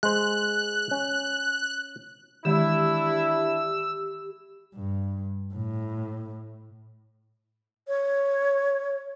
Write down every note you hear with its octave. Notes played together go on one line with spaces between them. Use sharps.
G#3 C5 F#6
C#4
D#3 E3 G#3 D4 E4 G4 E6
G2
A2
C#5